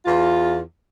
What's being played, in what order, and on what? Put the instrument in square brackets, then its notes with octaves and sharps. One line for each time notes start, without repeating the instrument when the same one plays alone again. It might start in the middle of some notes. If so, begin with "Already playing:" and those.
[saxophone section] E2 F4